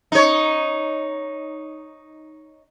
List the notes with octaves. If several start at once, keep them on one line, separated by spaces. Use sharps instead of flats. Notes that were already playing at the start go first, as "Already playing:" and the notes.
D#4 C#5